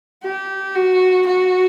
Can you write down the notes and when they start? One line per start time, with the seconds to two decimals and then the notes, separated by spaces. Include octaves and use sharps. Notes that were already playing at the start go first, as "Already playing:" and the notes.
0.24 G4
0.75 F#4
1.27 F#4